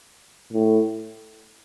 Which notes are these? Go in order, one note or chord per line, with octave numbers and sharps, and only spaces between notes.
A2